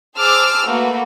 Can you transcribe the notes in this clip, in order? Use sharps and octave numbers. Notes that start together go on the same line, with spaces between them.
G#4 C5 A5 D6 E6 F6
A3 A#3 F#4 B4